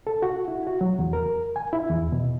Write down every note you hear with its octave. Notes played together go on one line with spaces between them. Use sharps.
A4
F#4
E4
F#4
F#3
E2
A#4
G#5
E4
E2
B2